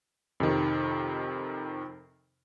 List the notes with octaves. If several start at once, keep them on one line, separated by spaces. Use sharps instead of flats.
F2 C3 D#3